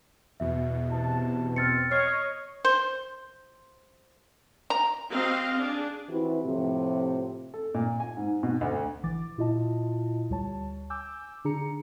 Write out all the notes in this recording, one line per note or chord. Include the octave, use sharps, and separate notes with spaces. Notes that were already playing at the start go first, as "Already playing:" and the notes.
E2 B2 E5
C3 A5
C4 F6 A6 C#7
C#5 D#5 F6 C7
C5
A#5
C4 F#4 D#5 F5
D4 G#4
E3 C4 E4 F#4 G4 B4
A2 C3 F3 C4
A4
A#2
G#5
G#2
B2
D2
A1 E3 D6 A6
A#2 E4 F4 D#5 A5
D2 G3 C#5 A5
G#5 D6 E6 G6
D3 D4 G#4 A#5 C#7